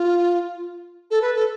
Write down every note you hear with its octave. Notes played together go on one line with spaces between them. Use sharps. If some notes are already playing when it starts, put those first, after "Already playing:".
Already playing: F4
A4
B4
A4